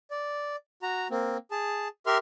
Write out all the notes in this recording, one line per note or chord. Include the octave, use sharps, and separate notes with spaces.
D5
F#4 A#5
A#3 C4
G#4 A5
G4 A#4 E5 C6 F6